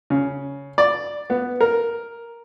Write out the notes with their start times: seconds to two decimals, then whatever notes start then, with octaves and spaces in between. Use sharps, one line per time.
0.10 C#3
0.78 D5
1.30 B3
1.61 A#4